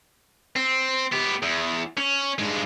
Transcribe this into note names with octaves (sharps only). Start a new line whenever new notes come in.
C4
B3 G4
E2
C#4
G2 G#3